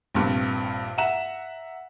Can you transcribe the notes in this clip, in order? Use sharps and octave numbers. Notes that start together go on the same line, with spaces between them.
A#1 G2 C3
E5 F#5 A#5 E7